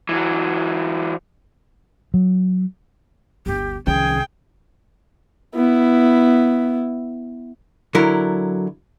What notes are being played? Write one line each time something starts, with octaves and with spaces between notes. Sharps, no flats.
E3 F#3
F#3
G1 D2 G4
C2 C3 D#3 F3 C#4 G#4 G5
B3 E4
D3 F#3 E4 A#4